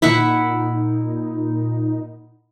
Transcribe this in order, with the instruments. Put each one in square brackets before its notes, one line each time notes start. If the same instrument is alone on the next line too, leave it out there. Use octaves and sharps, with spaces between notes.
[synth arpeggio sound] A#2 D#4 [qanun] E4 E5 F#5